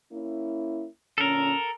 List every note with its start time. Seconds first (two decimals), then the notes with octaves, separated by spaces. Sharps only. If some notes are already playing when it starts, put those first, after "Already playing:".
0.12 A#3 C#4 E4
1.18 A#2 D3 C#4 A4 A#4